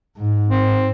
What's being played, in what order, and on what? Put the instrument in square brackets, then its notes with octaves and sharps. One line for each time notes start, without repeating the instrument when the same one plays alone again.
[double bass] G#2
[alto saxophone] C4